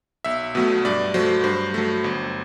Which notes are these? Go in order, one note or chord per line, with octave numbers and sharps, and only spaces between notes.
B1 E5
B2 F#3 A3
G2 D5
F#3 A3 C5
G2 C5
F#3 A3
G1